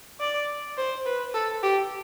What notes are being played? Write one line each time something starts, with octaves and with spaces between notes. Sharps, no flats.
D5
C5
B4
A4
G4